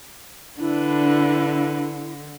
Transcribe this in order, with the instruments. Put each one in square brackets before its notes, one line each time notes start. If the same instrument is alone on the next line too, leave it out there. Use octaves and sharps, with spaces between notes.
[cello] D3 [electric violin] D4 B4 [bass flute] E4